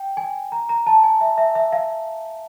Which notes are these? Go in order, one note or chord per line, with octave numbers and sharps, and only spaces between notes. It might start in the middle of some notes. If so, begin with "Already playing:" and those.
Already playing: G5
G#5
A#5
A#5
A5
G#5
E5
E5
E5
F5